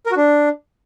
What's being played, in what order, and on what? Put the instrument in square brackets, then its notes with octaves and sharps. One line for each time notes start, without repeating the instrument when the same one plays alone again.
[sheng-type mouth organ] A#4
F#4
D4